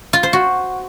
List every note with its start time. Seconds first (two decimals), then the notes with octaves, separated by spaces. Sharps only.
0.13 F4
0.23 C5
0.33 F#4